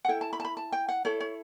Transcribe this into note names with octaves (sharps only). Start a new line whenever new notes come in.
F#5
E4 A4 G5
A5
B5
A5
B5
A5
G5
F#5
E4 A4 C#5
C#5